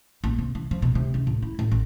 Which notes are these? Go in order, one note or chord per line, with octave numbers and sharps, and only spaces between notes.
A#1
C3
E3
F3
B2
C3
C#2
A2
E4
A2
A1